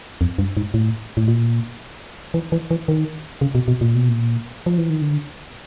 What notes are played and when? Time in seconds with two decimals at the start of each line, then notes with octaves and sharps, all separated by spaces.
0.21 F2
0.38 G2
0.57 G#2
0.74 A2
1.17 A2
1.28 A#2
2.34 E3
2.52 E3
2.71 E3
2.88 D#3
3.41 C#3
3.55 B2
3.68 B2
3.81 A#2
3.95 B2
4.09 A#2
4.66 F3
4.78 E3
4.90 D#3
5.02 D3